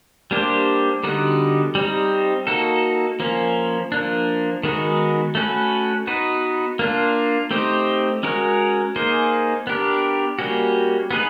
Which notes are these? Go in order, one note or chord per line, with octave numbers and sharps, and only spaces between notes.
G3 A#3 D4 G4 C5
D3 G3 B3 D#4 F#4
G3 C4 D#4
A#3 D#4 F#4 A4
F3 A#3 C#4
F3 A#3 D4
D#3 G#3 B3 D#4 F#4
A3 C#4 F#4 B4
B3 D#4 F#4 B4
A#3 D4 F4
A3 C4 D#4 G4 C5
G#3 C#4 F#4 A#4 C#5
A#3 D#4 G#4 C5
B3 D4 G4 A#4
G3 A#3 C#4 F#4
B3 D#4 G#4 B4